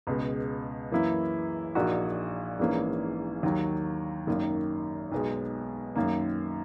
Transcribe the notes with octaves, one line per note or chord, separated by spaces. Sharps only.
C#2 B2 G#3
F#2 E3 A#3 E4
A#1 A#2 A#3 D#4 F#4
A#1 G#2 E3 A#3 C#4
D#2 D#3 F#3
G#1 F#2 D#3 A#3
B1 B2 G#3
F#2 D#3 A#3